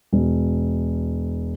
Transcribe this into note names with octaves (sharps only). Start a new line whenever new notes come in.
E1